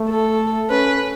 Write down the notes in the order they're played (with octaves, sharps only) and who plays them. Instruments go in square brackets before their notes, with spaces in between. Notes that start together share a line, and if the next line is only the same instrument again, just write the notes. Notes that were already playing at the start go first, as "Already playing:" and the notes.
Already playing: [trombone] A3
[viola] A4
[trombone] C#4 [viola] B4